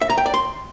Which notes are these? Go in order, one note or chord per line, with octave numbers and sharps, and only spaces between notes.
E5
A#5
G5
D5
C6